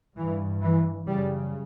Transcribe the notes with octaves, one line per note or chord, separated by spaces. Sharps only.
G2 E3
E3
F#2 C#3 G3